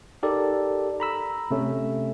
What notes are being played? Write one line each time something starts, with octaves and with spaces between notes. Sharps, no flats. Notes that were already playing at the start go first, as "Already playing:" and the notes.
D#4 G4 A4 A#4 D5
A#5 B5 E6
C3 A3 C#4